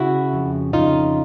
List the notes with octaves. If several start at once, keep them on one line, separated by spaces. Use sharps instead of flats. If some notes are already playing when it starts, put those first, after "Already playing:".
Already playing: C#3 E4 F#4
F2
C#3 D#4 F4